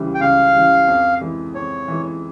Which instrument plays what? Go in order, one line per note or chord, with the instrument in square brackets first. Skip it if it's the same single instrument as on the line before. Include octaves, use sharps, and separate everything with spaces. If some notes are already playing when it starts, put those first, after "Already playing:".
Already playing: [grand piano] C#2 C#3 E3 G3
[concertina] G5
[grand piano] C#2 [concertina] F5
[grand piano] C#3 E3 G3
F2
E3 G#3
[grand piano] F2 [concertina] C#5
[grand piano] E3 G#3